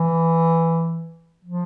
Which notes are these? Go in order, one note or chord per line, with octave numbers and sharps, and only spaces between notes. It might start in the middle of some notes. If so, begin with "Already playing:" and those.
Already playing: E3
F3